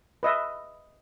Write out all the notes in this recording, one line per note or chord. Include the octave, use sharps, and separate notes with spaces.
B4 D#5 E5